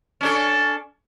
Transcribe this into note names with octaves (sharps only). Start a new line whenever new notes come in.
C#4 D4 A4